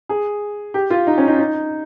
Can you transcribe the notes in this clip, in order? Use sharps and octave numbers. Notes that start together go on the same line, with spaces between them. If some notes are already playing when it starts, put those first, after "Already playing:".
G#4
G4
F4
D#4
C#4
D#4
D#4